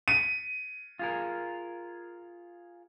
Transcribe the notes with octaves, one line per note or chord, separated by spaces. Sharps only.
D#7
F4 G#4 A#4